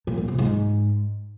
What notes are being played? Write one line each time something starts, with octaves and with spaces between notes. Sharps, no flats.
A#2
E2
C3
G#2